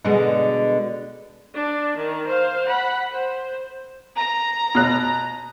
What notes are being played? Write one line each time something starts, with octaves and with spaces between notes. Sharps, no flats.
B2 D3 G#3
D4
D#3
C5 F5
F#5 B5
C5
A#5
B2 F#6